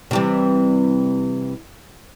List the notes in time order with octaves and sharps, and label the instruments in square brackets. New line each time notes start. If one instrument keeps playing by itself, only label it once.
[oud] C3 E3 G3